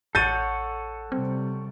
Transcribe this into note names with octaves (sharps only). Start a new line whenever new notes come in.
A1 A4 C#5 F#5 G6 A6 D#7
C3 G3 C4